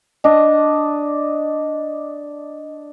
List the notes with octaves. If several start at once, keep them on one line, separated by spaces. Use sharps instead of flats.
D4 D#5